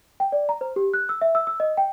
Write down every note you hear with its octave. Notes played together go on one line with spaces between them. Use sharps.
G5
D5
A#5
C5
G4
F#6
E6
E5
E6
E6
D#5
G5